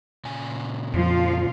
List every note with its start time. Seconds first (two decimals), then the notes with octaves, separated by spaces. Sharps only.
0.25 A#2 C#3 G#5
0.94 F2 F3 F4 F5